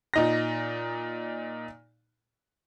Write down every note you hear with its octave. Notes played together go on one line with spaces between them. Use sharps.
A#2 D#4 A#6